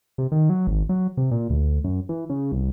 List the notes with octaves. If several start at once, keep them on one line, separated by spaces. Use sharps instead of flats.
C3
D#3
F#3
G#1
F#3
C3
A#2
D2
F#2
E3
C#3
C2